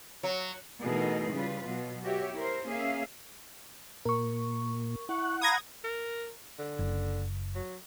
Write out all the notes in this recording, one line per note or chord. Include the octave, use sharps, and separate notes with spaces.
F#3
B2 E3 A3 D#4 G#4 A#4
C#3 G3 F4 B4
B2 F#3
F#4 G4 C#5 E5
E4 A#4 C5
A#3 C#4 G#4 E5 F5
A#2 A#4 C#6
E4 F#5 C#6
F5 A#5 B5 D#6 G#6 A#6
A#4
D3
F#1
F#3